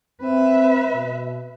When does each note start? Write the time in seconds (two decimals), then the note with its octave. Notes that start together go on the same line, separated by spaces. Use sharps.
0.22 C4 B4 E5
0.94 B2